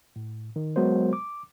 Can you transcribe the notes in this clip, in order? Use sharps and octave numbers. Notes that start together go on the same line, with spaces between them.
A2
D#3
F#3 G#3 B3 F#4 A#4 C5
D6